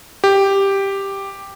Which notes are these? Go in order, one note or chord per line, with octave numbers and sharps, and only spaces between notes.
G4